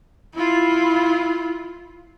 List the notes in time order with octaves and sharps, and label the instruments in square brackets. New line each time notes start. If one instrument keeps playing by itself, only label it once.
[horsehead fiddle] E4 F4